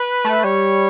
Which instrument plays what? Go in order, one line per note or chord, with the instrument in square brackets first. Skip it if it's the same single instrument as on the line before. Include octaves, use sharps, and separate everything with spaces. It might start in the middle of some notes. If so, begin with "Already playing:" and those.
Already playing: [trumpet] B4
[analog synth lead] A3
[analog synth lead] G3 [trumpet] C#5